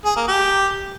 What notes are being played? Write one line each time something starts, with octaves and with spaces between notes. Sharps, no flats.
G#4
A#3
G4